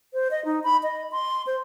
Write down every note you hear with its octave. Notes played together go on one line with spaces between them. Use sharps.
C5
D#5
D#4
B5
D#5
C6
C5